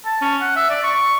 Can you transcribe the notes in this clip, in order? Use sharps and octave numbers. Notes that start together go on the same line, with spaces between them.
A5
C#4
F#5
E5
D5
C#6